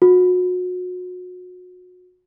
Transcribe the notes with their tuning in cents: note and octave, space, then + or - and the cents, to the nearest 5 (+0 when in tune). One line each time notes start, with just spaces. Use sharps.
F#4 -35